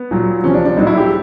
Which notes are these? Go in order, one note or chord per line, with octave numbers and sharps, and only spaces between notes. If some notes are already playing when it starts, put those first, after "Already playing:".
Already playing: B3
A#2 F#3
C3 F3 C#4
D4
D4
A2 F#3 D#4
E4
G4